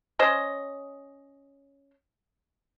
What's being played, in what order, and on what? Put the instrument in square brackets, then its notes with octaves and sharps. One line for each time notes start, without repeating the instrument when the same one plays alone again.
[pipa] C#4 C5 D#5